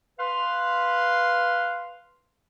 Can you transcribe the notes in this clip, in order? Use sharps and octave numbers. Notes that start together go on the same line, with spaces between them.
B4 F5 C6